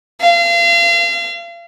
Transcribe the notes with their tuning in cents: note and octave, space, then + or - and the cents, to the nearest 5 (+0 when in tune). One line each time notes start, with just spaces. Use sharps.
F5 -35